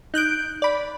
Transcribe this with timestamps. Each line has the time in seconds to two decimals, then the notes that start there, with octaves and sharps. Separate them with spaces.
0.14 D#4 F#6 G6 D7
0.62 D5 B5